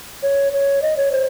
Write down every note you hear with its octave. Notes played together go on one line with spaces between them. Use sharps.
C#5
C#5
D#5
C#5
C5